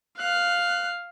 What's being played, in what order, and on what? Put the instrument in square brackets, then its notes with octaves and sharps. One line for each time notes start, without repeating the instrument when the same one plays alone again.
[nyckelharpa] F5 [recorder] F#6